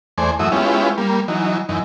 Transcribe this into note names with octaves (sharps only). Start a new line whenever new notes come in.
E2 A3 C5 D5 G#5
F#2 E3 A3 F#4 E5 D#6
G#3 B3 C#4 E4 F4 G4
G3 A#3
E3 F#3 D#4
F#2 E3 D#4